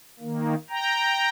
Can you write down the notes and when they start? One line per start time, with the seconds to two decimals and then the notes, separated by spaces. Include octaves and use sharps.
0.20 D#3 A#3
0.69 G5 A#5